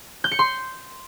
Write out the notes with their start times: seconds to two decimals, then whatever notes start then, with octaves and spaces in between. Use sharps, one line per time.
0.24 G6
0.31 C#7
0.39 C6